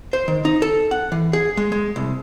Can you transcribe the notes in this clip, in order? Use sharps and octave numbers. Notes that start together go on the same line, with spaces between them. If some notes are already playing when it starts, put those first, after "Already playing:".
C5
D#3
D#4
A4
F#5
E3
G#4
G#3
G#3
C2